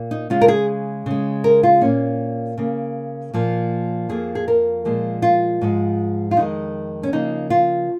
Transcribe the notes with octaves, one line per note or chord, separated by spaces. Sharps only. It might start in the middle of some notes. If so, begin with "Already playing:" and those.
Already playing: A#2 A#3
D#4
C#3 G#3 F4
A#4
G#4
C#3 G#3
A#4
F4
A#2 A#3 C#4
C#3 A#3
A#2 F3 A#3
F2 F3 A#3 G#4
G#4
A#4
A#2 F3 G#3
F4
G#2 F3 G#3
F4
F2 D#3 G#3 D#4
C#4
C#3 F3 A#3 D#4
F4